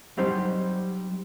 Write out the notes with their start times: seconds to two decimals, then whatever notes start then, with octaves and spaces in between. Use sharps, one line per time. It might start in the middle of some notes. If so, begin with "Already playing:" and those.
0.17 F#3 G3 C4 D#4 G4 C5